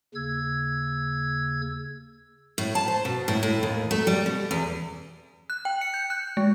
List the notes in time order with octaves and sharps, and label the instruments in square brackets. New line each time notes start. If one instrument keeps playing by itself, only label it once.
[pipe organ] D#2 C#3 E6 G#6
[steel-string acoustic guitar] A2
A5
C5
B2
A2
A2
D#2
A3
G3
B2
E2
[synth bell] F#6
G5
C#7
G6
F#6
G#3